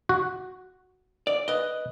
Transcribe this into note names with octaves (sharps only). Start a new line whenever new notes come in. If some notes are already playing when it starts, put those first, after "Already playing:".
F#4
D5
B4 D#5